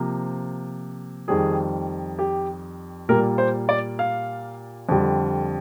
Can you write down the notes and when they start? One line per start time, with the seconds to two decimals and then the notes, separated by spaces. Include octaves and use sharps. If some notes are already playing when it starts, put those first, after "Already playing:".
Already playing: C3 F3 A#3
1.28 F2 D#3 G3 G#4
2.19 G4
3.09 A#2 G3 A#3 A#4
3.38 C5
3.69 D5
3.99 F5
4.89 F2 D3 G3